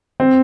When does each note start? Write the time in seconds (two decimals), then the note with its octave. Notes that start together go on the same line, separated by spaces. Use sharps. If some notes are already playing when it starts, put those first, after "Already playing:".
0.20 C4